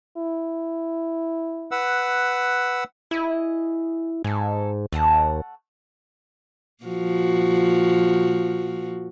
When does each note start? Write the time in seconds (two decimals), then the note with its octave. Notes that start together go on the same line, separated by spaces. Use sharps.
0.17 E4
1.71 B4 F#5 E6
3.11 E4 G#4 D#5
4.24 G#2 A4 G#5
4.92 D#2 A3 F#5 A5
6.84 A#2 F3 F#4